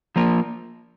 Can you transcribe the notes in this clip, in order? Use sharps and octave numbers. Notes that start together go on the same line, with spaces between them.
F3 A#3 F4 A#4